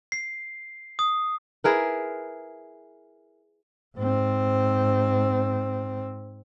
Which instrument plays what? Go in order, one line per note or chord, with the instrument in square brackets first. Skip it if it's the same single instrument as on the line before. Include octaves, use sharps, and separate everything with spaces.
[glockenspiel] C7
D#6
[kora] E4 G#4 A#4 B4
[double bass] G#2 C4